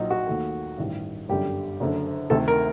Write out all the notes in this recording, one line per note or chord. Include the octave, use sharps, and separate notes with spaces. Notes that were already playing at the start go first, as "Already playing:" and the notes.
Already playing: A#1 A#2 F#3 D#4
F#4
D#2 D#3 A3
A1 G2 D#3 G3
G1 F#2 D3 G3 G4
F#1 F#2 D3
D2 C3 D#3 A3 A4
A#4